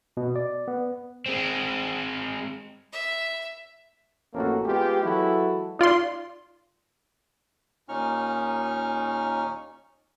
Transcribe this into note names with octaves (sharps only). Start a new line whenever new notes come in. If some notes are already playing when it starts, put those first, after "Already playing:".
B2
D5
B3
G#3 C4
E5
A1 F2 A#3 C#4 F#4 A4
G#3 B3 F4 G4
E3 F#3 G#3 E4 F#4 A4
D#4 F4 D5 C6
D#2 A#2 C#4 D#4 C#6 F6